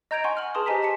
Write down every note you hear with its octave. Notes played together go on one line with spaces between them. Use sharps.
D#5 A#5 G6 G#6 D7 F7
F#5 G#5 C6 C#6
F6 F#7
G#4 B4 A5 C6 D#6
G4 C5 D#5 G#5 A#5 B6
A5 B6 C#7